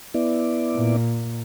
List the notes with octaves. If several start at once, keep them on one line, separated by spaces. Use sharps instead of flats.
B3 E4 D5
A#2